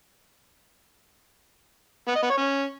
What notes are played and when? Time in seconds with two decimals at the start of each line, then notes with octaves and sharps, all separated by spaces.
2.08 B3
2.15 D#5
2.23 B3
2.30 C#5
2.38 C#4